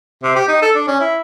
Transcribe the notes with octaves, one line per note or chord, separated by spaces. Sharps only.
C3
G4
D#4
A4
D4
C#4
E4